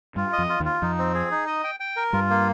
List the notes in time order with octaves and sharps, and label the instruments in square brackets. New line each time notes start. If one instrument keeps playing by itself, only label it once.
[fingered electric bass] G2 G3 [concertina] F4
[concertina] D#5
[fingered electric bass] F2 F3
[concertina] F4
[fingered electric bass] D#2 D#3
[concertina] F4
[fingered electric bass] F2 F3 [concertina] D#4
[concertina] C4
G#4
D#4
D#5
G5
G5
A#4
[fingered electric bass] G2 G3 [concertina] F4
[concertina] A#3